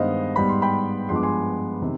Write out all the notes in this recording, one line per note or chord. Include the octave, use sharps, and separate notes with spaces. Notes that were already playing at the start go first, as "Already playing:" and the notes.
Already playing: G2 D#3 G#3 B3 C5 D#5 F5
G#2 G3 B3 B5
C6
G5 B5
G2 F3 G#3 B3 C6
D6
G#5 C6
C3 D#3